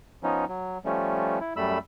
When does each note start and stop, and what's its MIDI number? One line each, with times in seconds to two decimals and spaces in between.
0.23 0.45 53
0.23 0.45 59
0.23 0.45 61
0.23 0.45 63
0.48 0.78 54
0.85 1.39 53
0.85 1.39 55
0.85 1.39 57
0.85 1.39 61
1.40 1.53 64
1.56 1.78 42
1.56 1.78 55
1.56 1.78 57
1.56 1.78 83
1.56 1.78 88